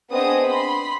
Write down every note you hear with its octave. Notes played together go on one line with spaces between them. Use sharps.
B3 C4 D4 G#4 D#5 D#6
B5 C6